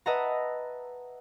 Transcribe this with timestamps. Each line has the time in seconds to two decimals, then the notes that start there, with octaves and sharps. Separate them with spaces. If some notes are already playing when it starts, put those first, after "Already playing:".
0.06 B4 D#5 E5 F#5 A5 A#5